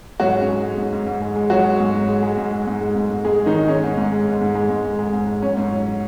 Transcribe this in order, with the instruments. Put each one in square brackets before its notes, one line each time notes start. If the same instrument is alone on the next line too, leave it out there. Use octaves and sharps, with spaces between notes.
[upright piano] G#2 F#3 F#4
G#3
C#4
G#3
G#3
G#2
G#2
G#2
G#3
G#3
F#3 G#3 F#4
G#3
G#2
G#2
G#3
G#3
G#2
G#3
G#2
G#3
G#2
G#2
G#2 G#3 G#4
G#3
D#3 D#4
G#3
G#3 C#4
G#2
G#2
G#3
G#2
G#2
G#3
G#2
G#2
G#3
G#2
G#3
F#3 C#4
G#2
F#3
F#3